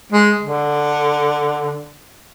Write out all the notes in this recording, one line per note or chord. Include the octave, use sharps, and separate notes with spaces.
G#3
D3